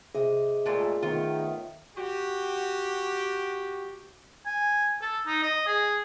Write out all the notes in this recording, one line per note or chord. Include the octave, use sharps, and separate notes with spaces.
C3 G#4 D#5
A#2 G#3 A3
D#3 A3 B3 F4 C#5
F#4 G4
G#5
A4
D#4
D#5
G#4